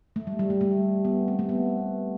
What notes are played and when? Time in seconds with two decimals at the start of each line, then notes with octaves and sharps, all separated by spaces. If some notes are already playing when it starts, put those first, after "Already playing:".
0.16 A3
0.27 G3
0.39 G3
0.50 A3
0.61 A3
1.05 B3
1.28 C4
1.39 A3
1.49 B3